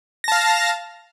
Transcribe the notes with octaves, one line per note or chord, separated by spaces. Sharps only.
F5 A5 A#6